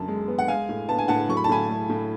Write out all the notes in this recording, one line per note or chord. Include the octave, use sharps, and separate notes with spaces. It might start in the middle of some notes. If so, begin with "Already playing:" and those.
Already playing: F#2 D3 A5
G#3
B3
F#5
G#3 F5 G#5
A2
B3 A5
G#5
A2 F#5 A5
F#3 C#6
B5
A5
A2 G#5 B5
A3
A2